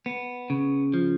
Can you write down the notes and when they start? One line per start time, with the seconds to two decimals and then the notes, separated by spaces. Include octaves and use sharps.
0.06 B3
0.50 C#3
0.94 F3